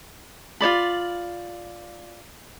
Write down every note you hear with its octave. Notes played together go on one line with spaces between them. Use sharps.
F4 C#5 D5 B5